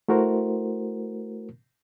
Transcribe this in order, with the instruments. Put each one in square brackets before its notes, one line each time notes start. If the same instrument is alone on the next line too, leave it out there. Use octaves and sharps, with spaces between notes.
[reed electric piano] A3 E4 F#4 A#4 C5